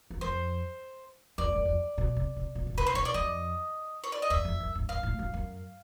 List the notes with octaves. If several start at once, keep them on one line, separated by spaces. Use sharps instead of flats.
E2
F2 C5
F2 D5
F#2
F2
B2
C3
C3
B2
C#3
C3
B4
C5
B2 C#5
D5
F2 D#5
C#5
D5
D#5
E2 E5
F2
F#2
G2
G2 F5
A2
G2
F#2